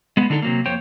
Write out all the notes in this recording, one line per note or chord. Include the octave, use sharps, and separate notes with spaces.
G#3 B3
D3 D4 D#4 A4
C3 F#3 A#3
F2 A#3 C5 C#5 G5